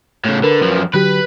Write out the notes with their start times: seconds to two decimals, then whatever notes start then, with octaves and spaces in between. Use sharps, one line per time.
0.25 A2 C#3
0.44 D3 A#4 B4
0.62 F#2 F3
0.94 D3 F#3 G4 B4